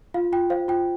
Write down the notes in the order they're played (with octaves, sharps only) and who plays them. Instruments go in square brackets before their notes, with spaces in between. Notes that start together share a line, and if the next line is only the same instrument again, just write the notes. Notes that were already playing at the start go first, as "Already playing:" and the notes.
[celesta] F4 F5
F4 G5
C5 F5
F4 G5